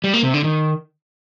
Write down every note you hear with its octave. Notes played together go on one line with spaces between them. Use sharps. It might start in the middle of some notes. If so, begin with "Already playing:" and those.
G3
A#3
C3
D3
D#3